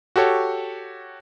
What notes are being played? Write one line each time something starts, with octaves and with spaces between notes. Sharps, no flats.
F#4 G4 A4 C#5